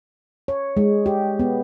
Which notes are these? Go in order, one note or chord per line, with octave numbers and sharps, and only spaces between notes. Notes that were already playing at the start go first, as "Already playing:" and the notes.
C#5
G#3
G4
B3